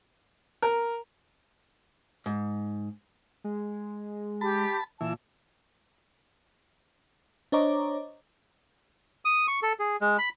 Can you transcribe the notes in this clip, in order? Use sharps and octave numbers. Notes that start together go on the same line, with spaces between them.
A#4
G#2
G#3
G4 A5 B5
A#2 E3 A5
D4 C5 C#5 D#5 A#5 D6
D#6
C#6
A4
G#4
G#3
B5